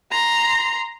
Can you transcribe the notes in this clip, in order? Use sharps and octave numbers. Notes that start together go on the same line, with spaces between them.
A#5 C6